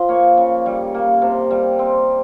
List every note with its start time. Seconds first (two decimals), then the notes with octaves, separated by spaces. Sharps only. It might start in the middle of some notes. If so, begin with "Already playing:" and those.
Already playing: F3 D#5
0.09 A#3 C#5
0.37 C#3
0.66 G3
0.94 A#3
1.22 C3
1.51 G3
1.79 C4